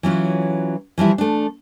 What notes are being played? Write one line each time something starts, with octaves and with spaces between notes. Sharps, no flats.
E3 F#3 C#4 F4
E3 F3 G3 E4
A3 D4